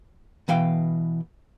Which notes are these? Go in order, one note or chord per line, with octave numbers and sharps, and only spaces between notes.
B2 E3 F5 G5